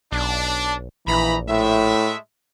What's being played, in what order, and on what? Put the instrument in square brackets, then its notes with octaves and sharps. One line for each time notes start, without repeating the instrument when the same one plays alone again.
[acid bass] B1 [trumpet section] D4
[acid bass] A#1 [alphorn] E3 [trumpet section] D#4 A#5 B5
[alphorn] A2 [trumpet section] G#3 A3 E5